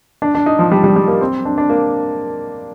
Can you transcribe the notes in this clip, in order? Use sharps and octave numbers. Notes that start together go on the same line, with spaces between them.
D4
D4
D#4
F3
G3
G3
G3
A#3
C4
D4
D4
A#3